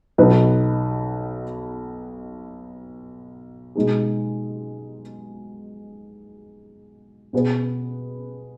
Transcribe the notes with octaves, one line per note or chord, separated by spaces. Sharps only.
B1 B2 B3 D#4 B4
B2 G#3 D#4 G#4
B2 B3 G#4 B4